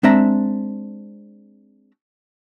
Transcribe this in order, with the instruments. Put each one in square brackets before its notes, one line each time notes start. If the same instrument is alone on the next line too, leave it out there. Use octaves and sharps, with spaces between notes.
[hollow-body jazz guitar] G#3 C4 D4 E5 A#5